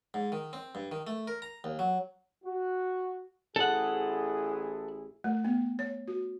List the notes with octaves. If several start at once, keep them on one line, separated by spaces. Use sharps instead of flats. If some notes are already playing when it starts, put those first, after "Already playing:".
G#2
D#3
C4
G2
D#3
A3
A#4
A#5
D#2
F#3
F#4
A1 E4 G#4 A4 F#5
A3
B3
C#5
F#4